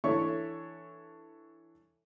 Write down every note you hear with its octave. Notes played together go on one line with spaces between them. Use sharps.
E3 D4 A4 C#5 E5 C#6